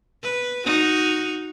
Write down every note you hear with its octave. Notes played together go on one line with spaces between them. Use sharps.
B4
D#4 F#4